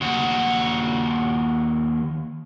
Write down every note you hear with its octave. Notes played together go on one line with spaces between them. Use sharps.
D#2 F#4